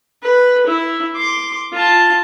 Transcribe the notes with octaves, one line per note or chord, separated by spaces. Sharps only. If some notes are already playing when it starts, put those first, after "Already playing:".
B4
E4
C6 D6
F4 A5